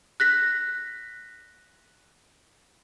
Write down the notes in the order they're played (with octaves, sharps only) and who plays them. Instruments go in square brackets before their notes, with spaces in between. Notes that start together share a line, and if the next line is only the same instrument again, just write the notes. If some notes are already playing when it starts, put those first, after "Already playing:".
[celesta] F#6 A#6 B6